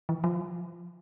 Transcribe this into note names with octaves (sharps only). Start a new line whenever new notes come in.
E3
F3